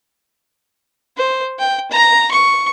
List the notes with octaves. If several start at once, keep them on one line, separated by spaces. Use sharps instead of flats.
C5
G5
A#5
C#6